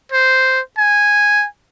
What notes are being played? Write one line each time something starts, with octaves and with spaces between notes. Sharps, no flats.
C5
G#5